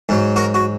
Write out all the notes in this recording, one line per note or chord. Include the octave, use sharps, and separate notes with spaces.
G#2 F#3
F#4 A#4
F#4